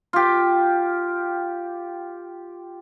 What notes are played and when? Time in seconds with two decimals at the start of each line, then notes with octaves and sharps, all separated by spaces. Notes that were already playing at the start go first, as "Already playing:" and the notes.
0.13 F4 G4